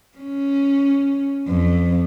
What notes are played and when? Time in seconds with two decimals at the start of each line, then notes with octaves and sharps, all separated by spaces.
0.18 C#4
1.48 F2